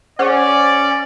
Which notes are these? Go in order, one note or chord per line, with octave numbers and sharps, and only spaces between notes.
C#4 G#4 C5 D5 F#5